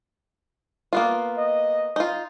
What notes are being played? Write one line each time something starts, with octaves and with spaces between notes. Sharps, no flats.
A#3 B3 F4
D#5
D#4 F4